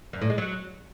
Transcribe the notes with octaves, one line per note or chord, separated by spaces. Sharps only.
F#2
A2
G#3
F#3